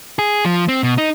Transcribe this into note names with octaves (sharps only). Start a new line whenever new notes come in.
G#4
F3
C4
B2
D#4